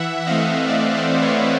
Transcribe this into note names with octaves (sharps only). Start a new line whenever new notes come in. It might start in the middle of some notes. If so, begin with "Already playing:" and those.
Already playing: E3 E5 F#5
F#5
A3 C4 D#5 F5
E3 D5 E5
D#5
C5 D5
A3 C4
B4 C#5